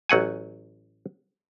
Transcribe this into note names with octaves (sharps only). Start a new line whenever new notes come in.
A1 F#3 F#5 G#5